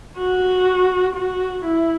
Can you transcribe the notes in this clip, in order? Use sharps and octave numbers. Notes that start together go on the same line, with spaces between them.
F#4
F#4
E4